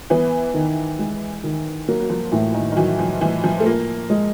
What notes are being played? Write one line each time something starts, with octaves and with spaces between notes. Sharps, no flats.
E3 B3
D#3
G#3
D#3
F#3 A#3
F#3
F3
A2 E3
D#3
D#3
E3 F#3
F3
A2 E3
F3
A3
F3 A#3
G#3